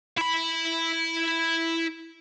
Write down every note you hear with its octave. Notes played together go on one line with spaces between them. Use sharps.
E4 B5